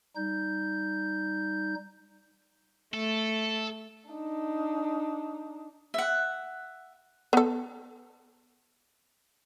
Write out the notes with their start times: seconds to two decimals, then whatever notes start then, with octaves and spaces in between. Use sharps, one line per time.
0.16 G3 D#4 G6
2.94 A3 A4
4.10 D4 D#4
5.94 E5 F#5
7.33 B3 A4